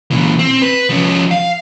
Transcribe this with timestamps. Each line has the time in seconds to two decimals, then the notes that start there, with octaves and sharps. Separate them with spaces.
0.11 A#2 E3
0.39 C4
0.62 B4
0.90 F3 C#4
1.31 F5